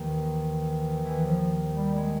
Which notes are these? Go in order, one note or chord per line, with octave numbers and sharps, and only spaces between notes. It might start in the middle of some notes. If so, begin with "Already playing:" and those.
Already playing: D#2 D#3 E3
E3
F3
G3
G#3